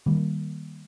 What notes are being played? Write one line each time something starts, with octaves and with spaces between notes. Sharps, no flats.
D#3 G3 A#3